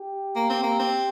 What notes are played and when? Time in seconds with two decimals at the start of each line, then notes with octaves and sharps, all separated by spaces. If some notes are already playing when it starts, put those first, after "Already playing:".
Already playing: G4
0.36 A#3
0.50 C4
0.63 A#3
0.79 C4